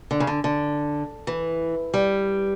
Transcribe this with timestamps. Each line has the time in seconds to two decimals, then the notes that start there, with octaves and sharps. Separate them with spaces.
0.11 D3
0.20 C#3
0.27 D3
0.44 D3
1.27 E3
1.94 G3